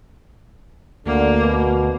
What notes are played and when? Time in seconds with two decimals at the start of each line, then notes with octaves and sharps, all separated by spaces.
1.06 D2 D3 A#3
1.41 B2